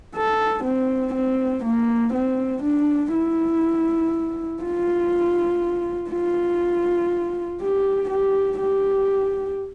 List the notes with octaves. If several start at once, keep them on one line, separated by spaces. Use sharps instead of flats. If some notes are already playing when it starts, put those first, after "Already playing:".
A4
C4
C4
A#3
C4
D4
E4
F4
F4
G4
G4
G4